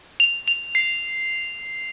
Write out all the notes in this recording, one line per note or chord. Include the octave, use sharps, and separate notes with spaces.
F7
F7
C7